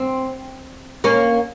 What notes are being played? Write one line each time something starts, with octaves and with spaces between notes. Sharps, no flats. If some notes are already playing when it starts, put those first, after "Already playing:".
Already playing: C4
A#3 C#4